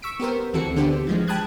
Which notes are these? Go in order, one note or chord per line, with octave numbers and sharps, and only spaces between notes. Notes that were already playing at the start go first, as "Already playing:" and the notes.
C#6 E6 B6 D7
B3 G4 A#4 C5
D2 E3 C4 F#4 A4 C#7
D3 B3 D4 G4 C5
E3 F3 G#3
G5 A5 B5 D#6 F#6 G#6